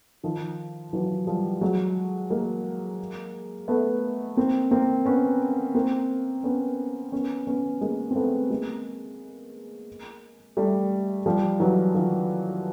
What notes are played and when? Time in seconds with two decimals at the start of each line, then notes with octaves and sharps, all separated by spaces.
0.23 D#3 F3
0.93 E3 F#3
1.27 F3 G3
1.61 F#3 G#3
2.30 G#3 A#3
3.68 A3 B3
4.37 A#3 C4
4.71 A#3 C4
5.06 B3 C#4
5.75 A#3 C4
6.44 B3 C#4
7.12 B3 C#4
7.47 B3 C#4
7.81 G#3 A#3
8.11 C4
8.16 A3 B3
8.50 G#3 A#3
10.57 G3 A3
11.26 F3 G3
11.60 E3 F#3
11.94 D#3 F3